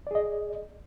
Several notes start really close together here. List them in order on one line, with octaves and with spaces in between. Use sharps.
D5 G#4 D#5